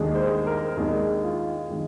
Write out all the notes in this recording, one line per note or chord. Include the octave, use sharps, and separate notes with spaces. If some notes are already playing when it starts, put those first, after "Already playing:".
Already playing: D#2 D#3 G#3 D4 G#4
C5
A#4
A#4
D#2 D#3 G#3 D4 G#4
F4
D#3 G#3